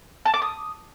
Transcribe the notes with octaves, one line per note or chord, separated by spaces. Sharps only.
A5
D6
D#6